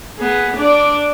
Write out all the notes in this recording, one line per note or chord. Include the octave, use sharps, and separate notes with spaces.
B3 G#4
D4 D5